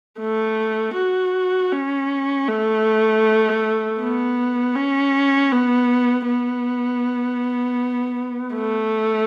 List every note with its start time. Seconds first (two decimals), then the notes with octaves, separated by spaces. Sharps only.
0.20 A3
0.95 F#4
1.72 C#4
2.48 A3
4.00 B3
4.76 C#4
5.52 B3
6.28 B3
8.55 A3